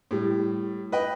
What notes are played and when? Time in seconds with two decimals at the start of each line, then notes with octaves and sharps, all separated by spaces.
0.11 A2 G3
0.92 B4 D#5 G5